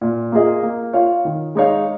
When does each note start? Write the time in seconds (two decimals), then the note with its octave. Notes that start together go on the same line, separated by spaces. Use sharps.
0.01 A#2
0.32 A#3 F4 G#4 D#5
0.63 A#3
0.93 F4 C#5 F5
1.25 D#3
1.55 G#3 D#4 C#5 F5